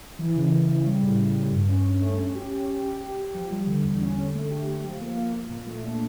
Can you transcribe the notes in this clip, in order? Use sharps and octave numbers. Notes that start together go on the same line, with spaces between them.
E3
C#3
C#3
C#3
G3
A2
A2
A2
G2
C#4
C#4
A3
C#4
G4
C#4
G4
G4
G4
G4
F3
G3
D3
E2
C#4
D3
A3
G4
A3
F3
A#3
A#3
A#3
A#2
A3
D4